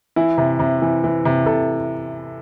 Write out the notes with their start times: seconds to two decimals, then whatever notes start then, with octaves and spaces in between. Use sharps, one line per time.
0.16 E3 E4
0.38 C3
0.59 C3
0.82 E3
1.04 E3
1.25 C3
1.46 C3 A4